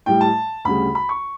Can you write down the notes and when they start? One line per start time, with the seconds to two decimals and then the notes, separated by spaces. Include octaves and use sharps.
0.06 A2 G3 G5
0.21 A5
0.65 D2 C#3 G3 B5
0.95 B5
1.09 C#6